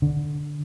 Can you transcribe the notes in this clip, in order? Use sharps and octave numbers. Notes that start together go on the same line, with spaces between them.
D3